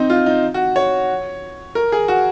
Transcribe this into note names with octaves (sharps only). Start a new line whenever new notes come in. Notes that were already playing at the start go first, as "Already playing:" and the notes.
Already playing: C4 D#4
F4
D#4
F#4
C#5
A#4
G#4
F#4